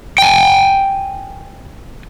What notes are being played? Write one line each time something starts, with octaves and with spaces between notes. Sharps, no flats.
G5 G#5